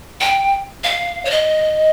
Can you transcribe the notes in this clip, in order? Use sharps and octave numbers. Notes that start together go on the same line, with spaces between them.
G5
F5
C#5
D#5